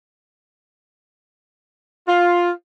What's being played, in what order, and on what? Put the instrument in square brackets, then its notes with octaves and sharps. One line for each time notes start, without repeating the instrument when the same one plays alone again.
[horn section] F4